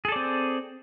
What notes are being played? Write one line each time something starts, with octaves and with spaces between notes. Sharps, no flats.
C4 G#4 A4 D5